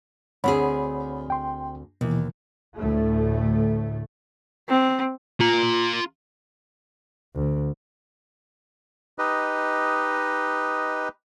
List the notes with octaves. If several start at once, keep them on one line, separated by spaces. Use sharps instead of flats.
D2 C4 G#4 C#5 F#5 B5
G5 C6
D#2 B2 E3
D2 A2 A3
C4
F4 A#5
D2
D#4 G4 B4 D#5